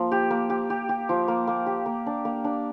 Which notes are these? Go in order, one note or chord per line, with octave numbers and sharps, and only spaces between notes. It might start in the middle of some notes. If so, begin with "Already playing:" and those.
Already playing: F3 A#3
G4
A#3
G4
G4
G4
F3
A#3
A#3
G4
A#3
D4
A#3
D4